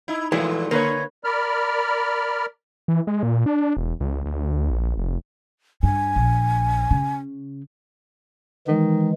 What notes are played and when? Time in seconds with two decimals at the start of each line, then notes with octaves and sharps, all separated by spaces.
0.08 D#4 E4
0.32 A#2 E3 F3 G#3 A3
0.71 D3 A#3 B4 C#5
1.24 A#4 D5 B5 F6
2.88 E3
3.07 G#3
3.23 A#2
3.46 D4
3.77 E1
4.01 C#2
4.26 D2
4.71 A#1
4.98 F1
5.83 G2 G#5
6.16 A#1
6.91 C#3
8.68 D#3 E3 G#3